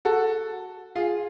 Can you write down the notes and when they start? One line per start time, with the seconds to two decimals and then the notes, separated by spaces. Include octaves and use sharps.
0.05 F#4 A4
0.95 F4 G#4